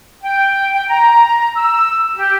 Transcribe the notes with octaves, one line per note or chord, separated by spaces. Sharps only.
G5
G5
A#5
E6
G4